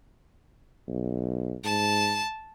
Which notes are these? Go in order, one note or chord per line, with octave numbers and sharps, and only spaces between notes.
B1
G#2 A5